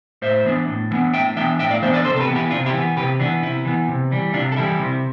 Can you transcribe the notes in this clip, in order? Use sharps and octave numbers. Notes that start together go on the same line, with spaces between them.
A2 C5 E5
E3 B3 D4
A2
E3 B3 D4
A2 E5 G5
E3 B3 D4 E5 G5
A2 E5 G5
D5 F5
E3 B3 D4 C5 E5
B4 D5
C3 A4 C5
A4
G4 B4
E3 B3
E4 G4
C3 D4 F4
E4 G4
E3 B3
C3 G4 B4
E3 B3 D4
C3 E4
E3 B3
C3
E3 G3
C3 D4 F4
A4
E3 G3 E4 G4
C3